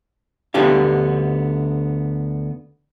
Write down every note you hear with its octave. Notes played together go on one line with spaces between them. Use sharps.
D2 D3 B3 D4 G4 F5